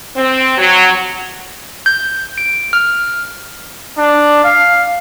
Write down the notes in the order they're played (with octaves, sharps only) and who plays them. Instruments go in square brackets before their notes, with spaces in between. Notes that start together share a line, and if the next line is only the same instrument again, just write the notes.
[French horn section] C4
F#3
[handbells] G6
D7
F6
[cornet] D4
F5